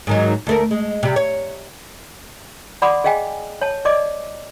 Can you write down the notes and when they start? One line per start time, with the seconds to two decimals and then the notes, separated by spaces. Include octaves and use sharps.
0.07 G#2 D#3 F#3
0.47 D2 A3 A#4
0.71 G#3
1.03 C3 G3
1.16 C#5
2.82 D5 F#5 B5 C6 D6 D#6
3.04 G#4 D#5 F5 G5 G#5
3.61 C#5 A5
3.85 D5 D#5 D6